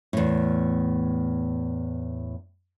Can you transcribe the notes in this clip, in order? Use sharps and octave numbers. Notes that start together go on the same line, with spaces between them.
E2 A2